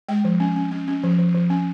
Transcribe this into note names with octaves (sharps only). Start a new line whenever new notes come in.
G#3 G5
F3
C#4
C#4
C#4
C#4
F3
F3
F3
C#4